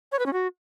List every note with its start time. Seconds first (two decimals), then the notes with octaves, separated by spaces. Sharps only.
0.12 C#5
0.19 B4
0.26 C#4
0.33 F#4